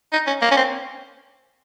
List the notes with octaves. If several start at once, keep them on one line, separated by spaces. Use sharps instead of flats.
D#4
C#4
A#3
C#4
C4